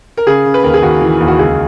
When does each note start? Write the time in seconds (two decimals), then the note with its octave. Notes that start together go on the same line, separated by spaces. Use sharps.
0.17 A#4
0.27 C#3 G#4
0.46 C#3
0.54 B4
0.63 D#2 A#4
0.74 G#4
0.82 D#2 F#4
1.01 E3
1.20 D#2
1.28 F#4
1.38 C#2 G#4